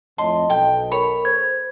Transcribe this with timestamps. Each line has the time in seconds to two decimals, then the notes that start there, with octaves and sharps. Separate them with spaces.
0.18 F2 A2 D#5 A5 C6
0.50 B1 A4 G5
0.92 A#4 C#5 B5
1.25 C5 G#6